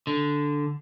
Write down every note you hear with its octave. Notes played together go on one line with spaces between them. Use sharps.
D3